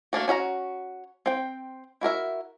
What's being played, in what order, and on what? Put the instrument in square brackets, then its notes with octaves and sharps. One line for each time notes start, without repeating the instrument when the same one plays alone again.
[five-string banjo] A3 A#3 D4 F#4
C#4 F#4 E5 A#5
C4 G5
E4 F#4 A#4 E5